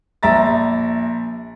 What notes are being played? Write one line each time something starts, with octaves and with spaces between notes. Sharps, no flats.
A#1 E5 A#5 A6